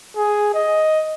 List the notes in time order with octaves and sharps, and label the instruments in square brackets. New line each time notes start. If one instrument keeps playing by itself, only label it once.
[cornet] G#4
D#5